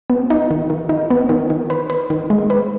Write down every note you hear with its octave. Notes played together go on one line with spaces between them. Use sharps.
B3
D#4
D#3
D#3
D#4
B3
D#3
D#3
B4
B4
D#3
G#3
B4